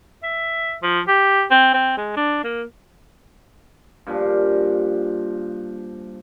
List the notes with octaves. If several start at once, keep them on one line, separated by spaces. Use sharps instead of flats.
E5
F3
G4
C4
C4
G#3
D4
A#3
G2 A#2 F3